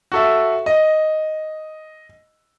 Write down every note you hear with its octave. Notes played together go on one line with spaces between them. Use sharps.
F#4 A4 E5
D#5